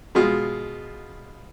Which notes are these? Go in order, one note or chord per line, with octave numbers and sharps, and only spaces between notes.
B2 G#3 F4